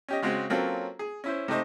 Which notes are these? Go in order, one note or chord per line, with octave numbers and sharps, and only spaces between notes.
C#4 G4 D#5
C#3 G#3 C4 F#4
F#3 A#3 C4 C#4 F4 A4
G#4
C#4 E4 C5
C3 A3 D#4 C5